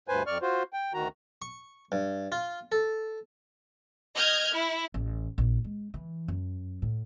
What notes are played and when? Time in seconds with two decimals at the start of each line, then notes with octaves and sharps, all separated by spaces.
0.08 D2 G2 B4 C5 G#5
0.27 F2 D5 C#6 F6
0.42 F4 F#4 C5
0.73 G5
0.94 D2 D#3 F#4 A#5
1.42 C#6
1.92 G2
2.32 F4
2.72 A4
4.16 D#5 F6 G6 G#6
4.53 E4
4.94 A1
5.38 A#1
5.64 G#3
5.94 E3
6.28 F#2
6.82 A2